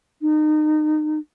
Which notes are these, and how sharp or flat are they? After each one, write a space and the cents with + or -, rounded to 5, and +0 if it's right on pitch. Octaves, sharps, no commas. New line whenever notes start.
D#4 -30